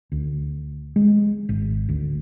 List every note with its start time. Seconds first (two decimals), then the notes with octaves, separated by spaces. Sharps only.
0.12 D2
0.96 G#3
1.49 G#1
1.89 D2